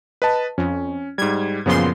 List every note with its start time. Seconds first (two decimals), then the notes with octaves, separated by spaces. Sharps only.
0.22 B4 D#5 A5
0.58 F2 C#4
1.18 G#2 G3 G#6
1.66 F#2 A#2 C#3 F3 B3 C6